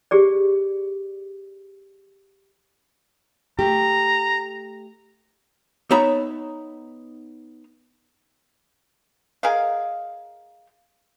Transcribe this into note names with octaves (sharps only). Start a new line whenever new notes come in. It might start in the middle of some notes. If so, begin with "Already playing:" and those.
G4 G#4 D5
A3 G4 A#5
B3 D#4 C#5 E5 A#5 B5
G#4 A#4 D#5 F5